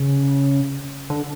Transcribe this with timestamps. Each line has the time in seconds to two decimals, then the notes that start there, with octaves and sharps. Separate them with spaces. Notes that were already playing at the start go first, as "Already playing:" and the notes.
Already playing: C#3
1.10 D3